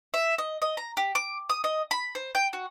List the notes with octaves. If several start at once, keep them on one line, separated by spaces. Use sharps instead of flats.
E5
D#5
D#5
A#5
G4
D6
D#6
D#5
B5
C5
G5
F#4